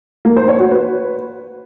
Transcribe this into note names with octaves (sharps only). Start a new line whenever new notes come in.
A#3
C5
C#5
F#4
B4